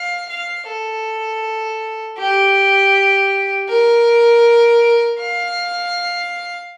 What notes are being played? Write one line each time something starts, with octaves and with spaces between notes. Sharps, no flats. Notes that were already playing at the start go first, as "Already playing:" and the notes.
Already playing: F5
F5
A4
G4
A#4
F5